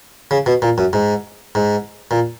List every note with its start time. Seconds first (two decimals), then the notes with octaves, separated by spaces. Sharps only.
0.31 C#3
0.46 B2
0.62 A#2
0.78 F#2
0.93 G#2
1.55 G#2
2.11 A#2